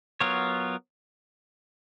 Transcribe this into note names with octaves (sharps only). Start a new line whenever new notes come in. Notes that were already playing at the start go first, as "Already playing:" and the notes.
F#3 B3 F4 A#4 C#5